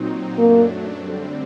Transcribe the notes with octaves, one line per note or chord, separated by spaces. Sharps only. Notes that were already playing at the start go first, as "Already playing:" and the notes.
Already playing: A#2 F#3 C4 D#4
F#2 F#3 A3 A#3 D4
D3 G3 C4